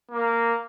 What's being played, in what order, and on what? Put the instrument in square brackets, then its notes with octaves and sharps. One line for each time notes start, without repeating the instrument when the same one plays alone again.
[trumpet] A#3